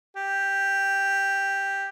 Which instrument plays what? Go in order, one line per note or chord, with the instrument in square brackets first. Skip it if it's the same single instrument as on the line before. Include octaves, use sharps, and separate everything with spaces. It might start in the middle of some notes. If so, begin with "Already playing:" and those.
[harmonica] G4